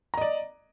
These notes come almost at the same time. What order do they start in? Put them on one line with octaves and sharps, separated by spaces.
A#5 D#5 D5